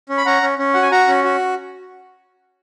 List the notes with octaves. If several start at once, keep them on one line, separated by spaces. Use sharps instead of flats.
C#4
B5
C#4 F#5 A#5
C#4
C#4
F#4 F#5
G#5
F#4 F#5 A#5
C#4
F#4